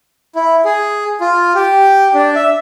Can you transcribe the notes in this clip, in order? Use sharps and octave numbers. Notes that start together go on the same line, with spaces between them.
E4
G#4
F4
G4
D4
E5